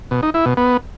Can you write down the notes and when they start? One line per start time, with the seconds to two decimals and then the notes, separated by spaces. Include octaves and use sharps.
0.11 B2
0.23 D#4
0.34 E4
0.46 B2
0.57 B3